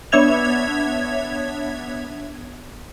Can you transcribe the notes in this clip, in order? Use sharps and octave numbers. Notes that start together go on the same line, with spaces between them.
B3 D4 C#5 E5 G#6 F7